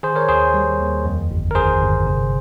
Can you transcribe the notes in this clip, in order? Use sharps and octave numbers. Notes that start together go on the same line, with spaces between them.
D#3 G#4 C5
A#4 C#5
D#2 G#4 C5
G3
D#2
F2
G1
A#4
D#3 G#4 C5
G1
C3